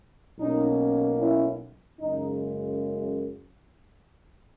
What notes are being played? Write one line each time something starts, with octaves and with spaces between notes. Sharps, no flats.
B1 B2 A#3 C#4 D#4
C#4 E4
F#1 F#2 C#3 G#3 D#4